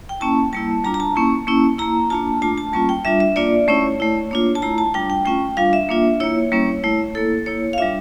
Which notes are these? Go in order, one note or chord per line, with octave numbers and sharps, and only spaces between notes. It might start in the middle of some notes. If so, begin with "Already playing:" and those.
G5
A#3 C#4 E4 A5
G3 A#3 E4 A5
G3 D4 F4 A#5
A#5
A5
A#3 C#4 E4
A#3 C#4 E4
A#3 E4 A#5
A#3 D4 F4 A5
A3 D4 F4 A5
A5
G3 A#3 C#4 F4 A5
G5
G3 D4 F4 E5
E5
A#3 D4 F4 D5
A3 C#4 E4 C#5
A3 E4
A#3 D4 F4
A5
A3 E4 A#5
A5
G3 D4 F4 G5
G5
A3 C#4 F4 G5
G3 D4 F4 F5
E5
A#3 D4 F4
A#3 E4 C#5
G3 A#3 C#4 E4
A3 E4
A#3 E4 A4
A#3 E4 C#5
F5
G3 D4 F4 E5